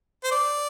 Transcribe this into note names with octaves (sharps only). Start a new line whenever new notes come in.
C5
D5